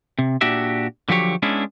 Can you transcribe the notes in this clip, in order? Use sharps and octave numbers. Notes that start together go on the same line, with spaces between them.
C3
A#2 D4 F#4 G4 E5
D3 F3 F#3 G4 C#5
G#3 B3 C#4 D4 E4